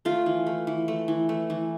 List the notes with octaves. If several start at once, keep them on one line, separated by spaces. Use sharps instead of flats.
A3 F4
E3
A3
E3
A3
E3
A3
E3